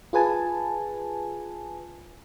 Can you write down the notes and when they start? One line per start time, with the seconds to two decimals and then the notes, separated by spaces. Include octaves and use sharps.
0.13 F4 G#4 B4 G#5 A5